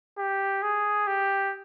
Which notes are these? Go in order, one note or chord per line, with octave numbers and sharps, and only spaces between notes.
G4
G#4
G4